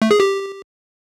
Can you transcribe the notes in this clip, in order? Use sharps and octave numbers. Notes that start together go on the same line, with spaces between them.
A3
G#4
G4